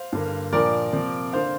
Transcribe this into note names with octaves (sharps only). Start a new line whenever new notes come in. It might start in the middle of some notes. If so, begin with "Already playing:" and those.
Already playing: C5 F5
G2 D3 A#3
A#2 F3 D4 A#4 D5
C3 F3 A#3
D3 A#3 D4 C5 F5